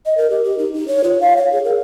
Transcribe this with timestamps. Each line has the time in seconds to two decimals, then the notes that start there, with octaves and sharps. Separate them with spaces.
0.06 D#5
0.17 A#4
0.30 G4
0.44 G4
0.58 D#4
0.74 D#4
0.88 C#5
1.04 F4
1.20 F5
1.37 C#5
1.52 G#4
1.64 A#4